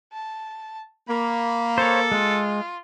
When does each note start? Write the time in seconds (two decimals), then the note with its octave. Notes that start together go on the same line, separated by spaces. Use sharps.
0.13 A5
1.09 A#3 B5
1.78 A4 C5 C#5
2.12 G#3 F4